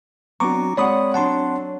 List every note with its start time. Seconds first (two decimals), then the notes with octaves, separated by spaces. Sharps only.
0.40 F#3 B3 C4 D4 F#4 A#5 C#6 D6
0.77 G#3 C4 C#5 D5 F#5 B5 D#6
1.14 F#3 D4 F#5 A5 C6